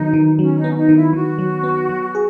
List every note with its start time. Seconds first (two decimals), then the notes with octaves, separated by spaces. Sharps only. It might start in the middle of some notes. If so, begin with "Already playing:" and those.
Already playing: D#3 F#3 B3 D#4
0.13 D#3
0.39 F#3 C#4
0.57 D#4
0.64 B3
0.70 C#4
0.76 D#4
0.89 D#3
0.95 E4
1.13 D#3 F#4
1.38 F#3
1.63 B3
1.89 F#3
2.15 G#4